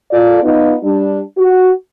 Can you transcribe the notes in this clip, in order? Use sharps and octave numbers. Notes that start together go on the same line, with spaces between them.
F4 A4 D5
B3 D#4 F4
G3 D4
F#4